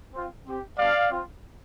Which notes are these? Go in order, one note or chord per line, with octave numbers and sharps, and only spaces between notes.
C4 F4
C4 G4
G3 B3 D4 D5 F5
C4 F4